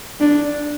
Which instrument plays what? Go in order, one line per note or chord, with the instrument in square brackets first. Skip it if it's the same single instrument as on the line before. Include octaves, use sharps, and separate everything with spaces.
[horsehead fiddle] D4